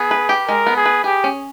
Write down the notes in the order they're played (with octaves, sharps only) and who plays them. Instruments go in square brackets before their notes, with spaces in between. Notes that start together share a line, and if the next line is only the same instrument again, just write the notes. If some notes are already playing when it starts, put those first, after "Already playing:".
Already playing: [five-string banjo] B3 [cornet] G#4
[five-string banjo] B4
G4
[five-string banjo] G#3 [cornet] A#4
[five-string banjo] B3
[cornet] G#4
[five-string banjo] B4
[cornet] G4 [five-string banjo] G#4
[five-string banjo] C#4